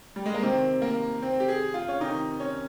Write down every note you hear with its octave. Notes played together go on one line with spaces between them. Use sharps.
G3
G#3
A#3
C3 D#3 C4
A#3
C4
G4
G#4
F4
C#4
C3 D#3 D#4
C#4